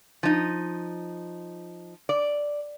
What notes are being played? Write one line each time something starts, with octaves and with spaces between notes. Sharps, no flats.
F3 D#4
D5